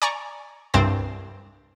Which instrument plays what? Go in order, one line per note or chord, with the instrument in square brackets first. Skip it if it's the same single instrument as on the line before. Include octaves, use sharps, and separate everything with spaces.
[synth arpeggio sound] D5 G#5 A#5 C#6
C2 G2 C4 C5 A6